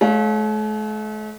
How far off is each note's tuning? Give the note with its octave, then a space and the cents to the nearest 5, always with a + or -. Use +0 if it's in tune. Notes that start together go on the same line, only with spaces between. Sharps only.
A3 -45 C#5 +0 F5 +20